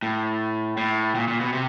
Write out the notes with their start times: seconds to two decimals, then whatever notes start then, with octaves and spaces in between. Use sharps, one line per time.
0.03 A2
0.77 A2
1.15 A#2
1.28 A#2
1.41 B2
1.53 C3